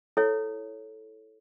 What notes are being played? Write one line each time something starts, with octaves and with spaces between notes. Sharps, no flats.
E4 A4 C#5